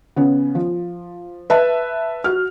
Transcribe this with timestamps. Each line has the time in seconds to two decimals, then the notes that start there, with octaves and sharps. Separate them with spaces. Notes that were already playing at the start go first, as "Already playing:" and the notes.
0.16 C#3 B3 C#4
0.55 F3
1.50 B4 E5 A5
2.24 F#4 F6